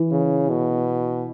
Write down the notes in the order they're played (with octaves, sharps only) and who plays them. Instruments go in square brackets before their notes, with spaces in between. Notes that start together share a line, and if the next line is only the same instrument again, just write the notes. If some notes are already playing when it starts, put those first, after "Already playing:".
Already playing: [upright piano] E3
[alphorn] C#3
B2